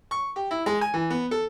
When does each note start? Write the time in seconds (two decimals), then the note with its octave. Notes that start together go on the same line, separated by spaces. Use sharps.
0.11 C#6
0.36 G4
0.51 E4
0.66 G#3
0.81 G#5
0.94 E3
1.10 B3
1.31 A4